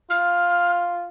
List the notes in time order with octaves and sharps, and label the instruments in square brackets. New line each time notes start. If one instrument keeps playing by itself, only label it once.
[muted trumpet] F4 [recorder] F6